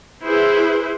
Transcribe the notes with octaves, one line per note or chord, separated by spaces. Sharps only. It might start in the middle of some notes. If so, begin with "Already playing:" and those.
E4 G#4 B4 C5